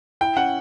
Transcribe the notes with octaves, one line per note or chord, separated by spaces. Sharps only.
E4 G5
C#4 F#5